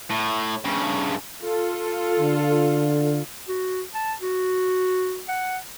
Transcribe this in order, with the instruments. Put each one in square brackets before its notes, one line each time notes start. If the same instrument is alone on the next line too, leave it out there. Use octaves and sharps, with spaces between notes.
[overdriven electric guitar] A2
G2 C#3
[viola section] F4 A4
[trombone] D3
[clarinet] F#4
A5
F#4
F#5